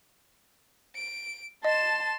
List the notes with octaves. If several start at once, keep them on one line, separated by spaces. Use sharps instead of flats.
D7
D#5 A5 C6 E7